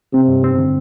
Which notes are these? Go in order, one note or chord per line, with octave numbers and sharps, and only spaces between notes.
C3 C4
G2
C4
D3